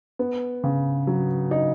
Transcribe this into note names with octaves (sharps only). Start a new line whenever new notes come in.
B3
C#3
F#3
D#4